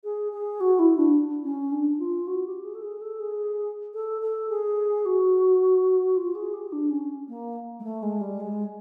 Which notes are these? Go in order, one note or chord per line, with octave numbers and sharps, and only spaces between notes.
G#4
G#4
F#4
E4
D4
C#4
D4
F4
F#4
G4
G#4
A4
G#4
A4
G#4
A4
A4
G#4
F#4
F4
G#4
G4
D4
C#4
A#3
G#3
A3
G#3
G3
G#3